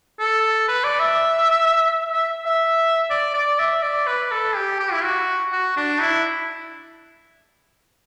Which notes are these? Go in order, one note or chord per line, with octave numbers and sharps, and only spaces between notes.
A4
B4
D5
E5
E5
E5
D5
D5
E5
D5
B4
A4
G4
G4
E4
F#4
F#4
D4
E4